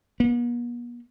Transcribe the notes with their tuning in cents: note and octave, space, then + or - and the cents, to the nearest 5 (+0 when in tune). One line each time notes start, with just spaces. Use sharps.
B3 -45